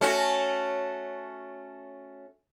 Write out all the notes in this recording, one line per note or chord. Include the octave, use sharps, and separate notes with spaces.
A3 C#4 F#4